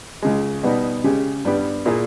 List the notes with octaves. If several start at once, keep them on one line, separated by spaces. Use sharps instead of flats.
C#2 C#3 G#3
B2 G3 B3 D#4
C#3 G#3 C#4 G4
G2 G3 B3 G4
A#2 A#3 E4 G#4